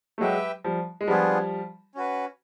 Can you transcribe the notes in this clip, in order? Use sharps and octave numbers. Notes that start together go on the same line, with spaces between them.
A3
F#3 G#3 G4 B4 E5 G5
F3 G3
G#3
F3 G3 B3 D4 F4 G#4
C#4 F#4 B4